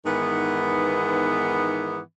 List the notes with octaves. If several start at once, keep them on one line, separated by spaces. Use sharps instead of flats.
G#2 D#3 E3 B3